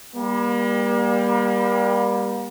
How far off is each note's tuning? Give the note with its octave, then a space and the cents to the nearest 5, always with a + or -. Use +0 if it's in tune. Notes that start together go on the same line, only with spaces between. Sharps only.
G3 +15 A#3 +40